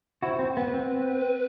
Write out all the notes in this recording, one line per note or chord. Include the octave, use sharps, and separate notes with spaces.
E4 F#4 C5
C4
B3 B4
C4